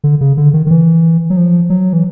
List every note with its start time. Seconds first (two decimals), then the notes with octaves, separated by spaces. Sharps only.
0.04 D3
0.21 C#3
0.37 D3
0.54 D#3
0.66 D#3
0.71 E3
1.30 F#3
1.37 F3
1.70 F#3
1.93 E3